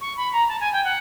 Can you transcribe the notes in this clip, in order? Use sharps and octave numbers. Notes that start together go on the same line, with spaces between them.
C#6
B5
A#5
A5
G#5
G5
F#5